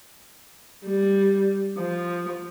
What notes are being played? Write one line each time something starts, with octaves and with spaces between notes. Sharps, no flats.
G3
F3